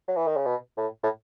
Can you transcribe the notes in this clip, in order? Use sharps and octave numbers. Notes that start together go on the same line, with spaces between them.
F#3
E3
D#3
C#3
B2
A2
A2